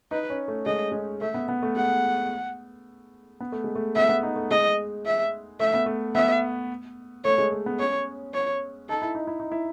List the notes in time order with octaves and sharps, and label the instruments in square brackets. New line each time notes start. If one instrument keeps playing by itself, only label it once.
[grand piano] D#4 [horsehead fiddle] B4
[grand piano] C#4
A3
[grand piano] G#3 [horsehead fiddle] D#5
[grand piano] G#3
[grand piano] A3 [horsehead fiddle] E5
[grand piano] B3
B3
A3
[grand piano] G#3 [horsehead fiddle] F#5
[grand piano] B3
A3
G#3
A3
[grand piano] B3 [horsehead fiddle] E5
[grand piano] B3
D#4
A3
[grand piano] G#3 [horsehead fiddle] D#5
[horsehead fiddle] E5
[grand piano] A3 [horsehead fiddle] E5
[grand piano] B3
A3
[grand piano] B3 [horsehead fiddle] E5
[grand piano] A3 [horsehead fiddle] C#5
[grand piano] G#3
A3
B3
[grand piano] C#4 [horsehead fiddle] C#5
[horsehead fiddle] C#5
[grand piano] D#4 [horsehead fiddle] A4
[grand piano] E4
D#4
E4
D#4
E4